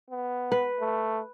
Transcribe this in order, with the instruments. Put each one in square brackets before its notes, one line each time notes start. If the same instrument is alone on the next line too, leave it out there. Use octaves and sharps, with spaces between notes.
[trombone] B3
[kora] B4
[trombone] A3